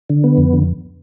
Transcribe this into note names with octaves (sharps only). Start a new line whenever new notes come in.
D3
B3
F2
D3